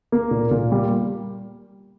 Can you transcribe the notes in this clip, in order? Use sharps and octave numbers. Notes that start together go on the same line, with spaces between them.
A#3
A#2
A#2
G3